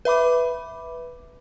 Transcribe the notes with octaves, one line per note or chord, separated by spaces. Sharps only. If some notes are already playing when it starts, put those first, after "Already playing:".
B4 E5 B5 D6